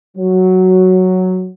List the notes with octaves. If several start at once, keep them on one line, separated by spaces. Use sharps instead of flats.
F#3